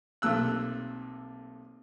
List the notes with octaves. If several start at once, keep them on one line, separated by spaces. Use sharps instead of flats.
B1 C3 A3 A#3 E6 F#6